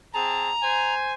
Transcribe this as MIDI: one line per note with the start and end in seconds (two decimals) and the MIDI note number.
0.14 0.52 60
0.14 0.52 68
0.14 0.52 81
0.14 0.94 82
0.62 1.14 72
0.62 1.14 80